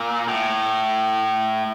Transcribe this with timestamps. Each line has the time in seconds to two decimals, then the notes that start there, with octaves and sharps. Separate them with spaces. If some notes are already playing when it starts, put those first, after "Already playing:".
Already playing: A#2
0.28 A2